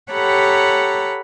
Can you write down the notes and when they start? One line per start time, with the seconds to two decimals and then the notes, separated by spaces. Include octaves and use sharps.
0.12 G4 A4 C#5 F#5 A#5 B5